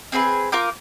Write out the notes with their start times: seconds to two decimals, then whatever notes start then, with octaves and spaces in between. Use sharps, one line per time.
0.12 C4 G#4 A4 B4
0.52 F4 A#4 D6 G6